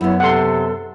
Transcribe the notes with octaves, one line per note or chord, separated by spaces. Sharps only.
F#2 B3 E4 C#5
C3 A4 F#5 C6